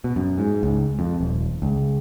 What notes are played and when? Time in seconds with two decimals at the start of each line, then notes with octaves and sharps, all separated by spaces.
0.04 B2
0.16 F#2
0.38 G#2
0.63 C#2
0.99 F2
1.21 D#1
1.62 C#2